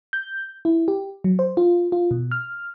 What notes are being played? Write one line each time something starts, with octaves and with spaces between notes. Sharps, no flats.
G6
E4
G4
F#3
C5
F4
F4
B2
F6